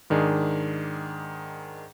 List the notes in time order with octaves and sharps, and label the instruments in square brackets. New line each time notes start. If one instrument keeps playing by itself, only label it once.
[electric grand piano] G#2 D#3 D4 G#4